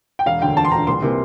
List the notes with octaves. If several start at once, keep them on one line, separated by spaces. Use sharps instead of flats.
G5
E1 F5
D2 D3 G5
E1 A5
C6
D2 D3 A#5
C2 C6
C3 E3 A#3